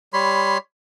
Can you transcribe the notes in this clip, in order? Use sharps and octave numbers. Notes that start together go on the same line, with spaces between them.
G3 C#5 B5 C6